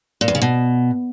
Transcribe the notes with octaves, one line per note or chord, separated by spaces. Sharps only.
A#2
E2
C#3
B2